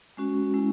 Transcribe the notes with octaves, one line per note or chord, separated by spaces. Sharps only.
G#3 C#4 F#4
G#3 C#4 E4